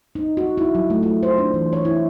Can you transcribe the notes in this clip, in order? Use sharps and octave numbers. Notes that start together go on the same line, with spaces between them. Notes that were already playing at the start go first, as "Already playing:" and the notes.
D#4
F#4
E4
F#3
A3
F4
C5
D4
E3
C#5
E4